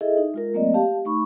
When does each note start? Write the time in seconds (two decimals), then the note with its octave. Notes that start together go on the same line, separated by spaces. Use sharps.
0.01 E4 G#4 A4 D#5 E5
0.17 D#4
0.34 G#3 F4 A#4
0.54 F#3 A3 A#3 C4 D5 D#5
0.74 G4 F5 A5
1.05 A3 D#4 B5 C#6